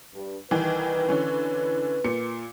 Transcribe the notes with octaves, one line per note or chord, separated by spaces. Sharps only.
G2
C2 D#3 E3 B4
D3 E3 C#4
A#2 C#7